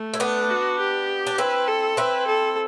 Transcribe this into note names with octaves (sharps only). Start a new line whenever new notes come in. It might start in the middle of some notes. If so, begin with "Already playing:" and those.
Already playing: A3
E4
B3 D4
F#4
G4
D4
C4 E4 B4
A4
C4 E4 B4
A4